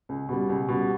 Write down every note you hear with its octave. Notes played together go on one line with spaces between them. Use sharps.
C#2
B2 G3
C#2
B2 G3